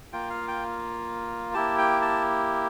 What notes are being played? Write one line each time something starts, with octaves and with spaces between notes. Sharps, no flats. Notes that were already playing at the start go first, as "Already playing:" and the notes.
A#3 F4 G5
F5
G5
A#3 E4 G4 A5
G5
A5